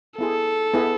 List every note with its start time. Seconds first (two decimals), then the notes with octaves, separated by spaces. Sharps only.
0.18 B3 E4 G#4 A4
0.74 B3 E4 G#4